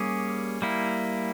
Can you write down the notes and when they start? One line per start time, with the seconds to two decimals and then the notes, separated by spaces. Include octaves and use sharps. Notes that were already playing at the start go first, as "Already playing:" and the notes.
Already playing: G3 A#3 C#4 G#4
0.62 G3 A#3 E4